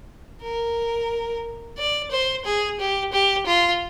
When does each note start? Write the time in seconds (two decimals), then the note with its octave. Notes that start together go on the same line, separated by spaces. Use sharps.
0.42 A#4
1.78 D5
2.11 C5
2.45 G#4
2.79 G4
3.12 G4
3.47 F4